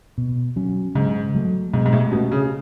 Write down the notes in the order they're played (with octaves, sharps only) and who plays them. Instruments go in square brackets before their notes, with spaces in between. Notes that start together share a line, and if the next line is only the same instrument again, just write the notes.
[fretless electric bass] B2
F#3 C#4
[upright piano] G#2 [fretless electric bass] C#3
[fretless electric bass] F#3 A3
[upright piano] G#2 [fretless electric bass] B2
[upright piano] G#2
A2
[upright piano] B2 [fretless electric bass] A3 C#4
[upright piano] C#3